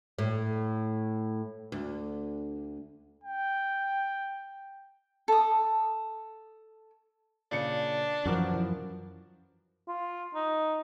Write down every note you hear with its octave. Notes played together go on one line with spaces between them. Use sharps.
A2
D2
G5
A4 D#6
A#2 C#3 D4 C#7
F#2 E3 F3 F#4 A#4 D6
F4
D#4